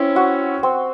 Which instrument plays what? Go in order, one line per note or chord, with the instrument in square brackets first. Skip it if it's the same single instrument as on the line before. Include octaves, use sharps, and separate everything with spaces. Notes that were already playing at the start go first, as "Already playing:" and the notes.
Already playing: [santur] C4 [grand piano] C#4 E4
[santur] F#4
C4